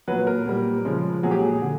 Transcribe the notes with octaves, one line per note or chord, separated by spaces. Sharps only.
A#2 F#3 B4
A#4
A#2 G3
C#3 F3 G#3
A#2 F#3 G#4
G4
G#4
D3